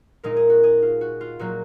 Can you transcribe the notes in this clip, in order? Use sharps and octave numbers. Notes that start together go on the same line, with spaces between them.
A#2 G#3 D#4 A#4
G#4
F#4
G#4
F4
F#4
F4
A#2 F#3 A#3 F#4